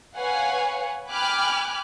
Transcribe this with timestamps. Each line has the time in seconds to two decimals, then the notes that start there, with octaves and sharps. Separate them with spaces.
0.17 B4 C#5 F5 F#5 G#5
1.11 G5 G#5 B5 D6 F6 F#6